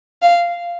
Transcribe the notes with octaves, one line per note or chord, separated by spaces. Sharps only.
F5